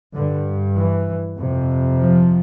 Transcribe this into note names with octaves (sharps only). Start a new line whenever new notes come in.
G2 D3
E3
F2 C3
F3